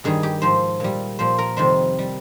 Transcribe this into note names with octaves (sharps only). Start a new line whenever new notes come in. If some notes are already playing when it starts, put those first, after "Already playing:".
G2 D#3 G3 G#4
G4
G#2 F3 C5
A#2 G3
A#2 F3 C5
A#4
F2 C3 D#3 G3 C5
G3